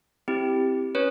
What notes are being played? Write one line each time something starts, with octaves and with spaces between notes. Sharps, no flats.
C4 E4 G4
C#4 B4 C#5